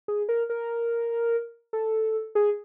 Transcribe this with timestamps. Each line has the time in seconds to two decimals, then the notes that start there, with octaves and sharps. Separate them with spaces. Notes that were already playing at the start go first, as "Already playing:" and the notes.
0.08 G#4
0.29 A#4
0.50 A#4
1.73 A4
2.35 G#4